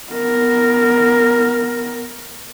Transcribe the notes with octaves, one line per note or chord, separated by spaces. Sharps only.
B3 A#4